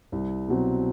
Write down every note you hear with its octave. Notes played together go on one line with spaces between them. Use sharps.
C2
B2 F#3 C4